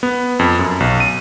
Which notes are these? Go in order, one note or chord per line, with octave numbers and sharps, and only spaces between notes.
B3
F2
F#2
B1
D#7